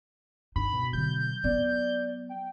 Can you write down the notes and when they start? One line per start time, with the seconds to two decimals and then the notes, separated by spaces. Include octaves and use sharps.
0.56 G2 D#4 B5
0.72 B2
0.93 D3 F#3 G6
1.44 F#3 B3 D5
2.29 G5